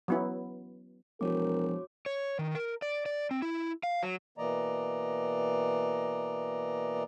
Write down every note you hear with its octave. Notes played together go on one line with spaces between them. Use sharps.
F#3 B3 E4
E1 F3 F#4 A#4 C#5 D6
C#5
D#3
A#4
D5
D5
C4
E4
F5
F#3
B2 E3 A#3 D5 D#5 A#5